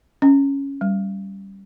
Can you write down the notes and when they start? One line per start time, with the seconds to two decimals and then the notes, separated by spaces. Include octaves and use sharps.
0.22 C#4
0.81 G3